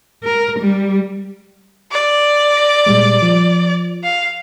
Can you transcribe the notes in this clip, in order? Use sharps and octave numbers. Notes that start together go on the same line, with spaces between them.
A#4
G3
D5
A#6
A#2 G3 G#3
F3
F5